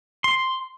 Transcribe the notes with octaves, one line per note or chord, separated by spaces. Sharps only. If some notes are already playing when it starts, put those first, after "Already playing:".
C6